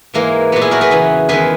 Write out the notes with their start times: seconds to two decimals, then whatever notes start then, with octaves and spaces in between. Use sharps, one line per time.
0.14 G#2 E3 G#3 A#3
0.52 A#2 F#3 B3
0.61 E4 G#4
0.71 F#4 A#4
0.81 G#4 B4
0.91 E2 C#3 E3
1.29 E2 D#3 G#3 G#4 B4